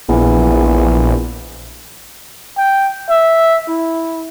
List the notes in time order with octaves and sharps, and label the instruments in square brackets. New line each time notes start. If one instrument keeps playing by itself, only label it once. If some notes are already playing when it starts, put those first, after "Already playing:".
[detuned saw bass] A#1 [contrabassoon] E2
[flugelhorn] G5
E5
E4